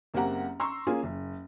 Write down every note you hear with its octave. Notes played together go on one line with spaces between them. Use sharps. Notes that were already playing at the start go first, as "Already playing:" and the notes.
F#1 A#3 C4 G4 F#5 A#5
A#5 C6 C#6 E6
A#3 C#4 F4 G#4
F#1